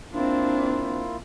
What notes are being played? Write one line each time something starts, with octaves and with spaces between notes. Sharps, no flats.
A#3 C4 D4 E4 F4